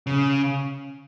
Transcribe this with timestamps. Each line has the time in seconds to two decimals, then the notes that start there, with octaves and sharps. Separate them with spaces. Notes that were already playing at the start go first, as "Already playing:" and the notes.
0.07 C#3